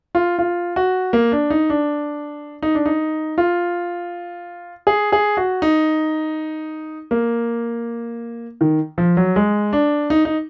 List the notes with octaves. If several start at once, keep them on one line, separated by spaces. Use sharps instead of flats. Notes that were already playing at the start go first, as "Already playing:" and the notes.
F4
F4
F#4
A#3
D4
D#4
D4
D#4
D4
D#4
F4
G#4
G#4
F#4
D#4
A#3
D#3
F3
F#3
G#3
D4
D#4
D#4